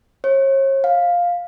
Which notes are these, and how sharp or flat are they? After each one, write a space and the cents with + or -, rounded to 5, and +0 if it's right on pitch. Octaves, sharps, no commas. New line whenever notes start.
C#5 -40
F5 +5